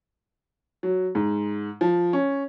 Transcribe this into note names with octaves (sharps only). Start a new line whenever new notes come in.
F#3
G#2
F3
C#4